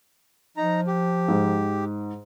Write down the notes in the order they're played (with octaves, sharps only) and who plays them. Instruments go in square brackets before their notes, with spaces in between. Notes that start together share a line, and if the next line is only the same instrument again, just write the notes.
[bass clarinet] F3 [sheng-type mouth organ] D#4 A#5
[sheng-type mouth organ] G4
[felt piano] G#2